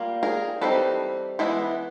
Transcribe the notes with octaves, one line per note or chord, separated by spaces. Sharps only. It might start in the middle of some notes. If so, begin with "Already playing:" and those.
Already playing: G3 A#3 F4
G#4 A#4
E3 G3 C4 D#4 A4 B4
E3 G#3 B3 E4